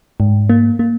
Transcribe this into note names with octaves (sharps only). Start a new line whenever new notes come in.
G#2
A#3
A#3